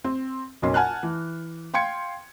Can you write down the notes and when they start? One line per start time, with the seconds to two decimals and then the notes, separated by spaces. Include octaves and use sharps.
0.04 C4
0.62 F#1 B1 C#4 C6
0.74 F#5 G#5 A5 F6 F#6
1.03 E3
1.74 F5 G5 C6 G#6 C#7